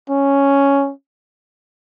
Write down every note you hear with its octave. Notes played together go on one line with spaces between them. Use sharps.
C#4